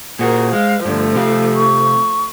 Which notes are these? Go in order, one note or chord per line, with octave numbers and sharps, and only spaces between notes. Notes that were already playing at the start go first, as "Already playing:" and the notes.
A#2 F#4 G#4 A#4 C5
G#3 F5
G2 D3 F3 A3
C3 G4 F5
C#6